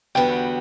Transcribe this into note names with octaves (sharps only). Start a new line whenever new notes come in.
E2 D3 G3 B3 F#4 G5